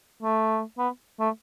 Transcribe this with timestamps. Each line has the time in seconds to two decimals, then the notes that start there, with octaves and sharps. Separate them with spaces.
0.22 A3
0.78 B3
1.20 A3